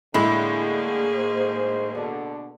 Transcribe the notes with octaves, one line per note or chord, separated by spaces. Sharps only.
A2 D3 G#3 A#3 E4 G#4
G#1 D#4 C5
B2 D3